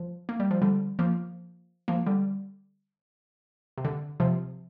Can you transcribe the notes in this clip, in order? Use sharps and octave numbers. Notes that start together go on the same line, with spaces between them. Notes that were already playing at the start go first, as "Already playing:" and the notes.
Already playing: F3
A#3
G3
F3
D3 G3
F3 A#3
F3 A#3
D3 G3
C3
D3
C3 F3